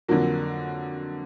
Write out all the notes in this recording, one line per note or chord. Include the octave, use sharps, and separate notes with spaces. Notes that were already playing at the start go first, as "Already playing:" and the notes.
F2 D3 F#3 A#3